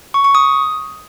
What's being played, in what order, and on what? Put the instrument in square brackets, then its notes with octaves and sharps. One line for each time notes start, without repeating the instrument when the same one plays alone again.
[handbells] C#6
C#6
D#6